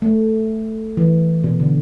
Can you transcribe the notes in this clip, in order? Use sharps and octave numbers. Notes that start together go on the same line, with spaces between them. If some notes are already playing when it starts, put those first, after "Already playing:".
A3
E3
B2
D3